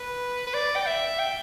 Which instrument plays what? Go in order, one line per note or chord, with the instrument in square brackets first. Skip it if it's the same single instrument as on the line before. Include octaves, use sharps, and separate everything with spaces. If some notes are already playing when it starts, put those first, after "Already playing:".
Already playing: [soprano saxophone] B4
B4
D5
G5
E5
G5